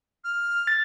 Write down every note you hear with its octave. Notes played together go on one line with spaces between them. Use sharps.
F6
A6